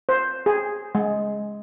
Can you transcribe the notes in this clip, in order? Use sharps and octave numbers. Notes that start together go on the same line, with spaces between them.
C5
G#4
G#3